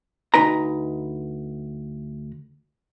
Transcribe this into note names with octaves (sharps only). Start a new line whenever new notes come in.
D2 D#4 B4 A#5